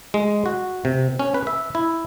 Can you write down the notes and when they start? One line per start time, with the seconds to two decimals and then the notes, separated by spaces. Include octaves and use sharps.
0.14 G#3
0.46 F#4
0.85 C3
1.19 C#4
1.34 B4
1.47 E5
1.75 E4